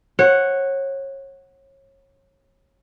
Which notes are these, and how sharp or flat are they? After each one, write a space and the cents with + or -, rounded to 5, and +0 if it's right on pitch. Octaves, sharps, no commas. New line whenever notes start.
C#5 -30 F#5 +0